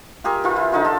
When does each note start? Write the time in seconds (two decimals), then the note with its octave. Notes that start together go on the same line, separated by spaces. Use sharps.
0.24 F4 G4 G#4 A#4
0.44 E3 F4
0.56 E3 E4
0.72 D3 D#4 F4
0.84 F4 A4 A5